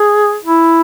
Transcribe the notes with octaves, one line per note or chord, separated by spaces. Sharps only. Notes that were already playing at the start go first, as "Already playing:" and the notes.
Already playing: G#4
E4